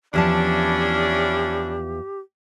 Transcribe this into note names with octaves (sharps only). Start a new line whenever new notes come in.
E2 F3 C#4 D4 E4 G4 A5